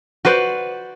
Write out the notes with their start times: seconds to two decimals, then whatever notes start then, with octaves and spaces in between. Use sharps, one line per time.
0.25 F#4 B4 C5 D5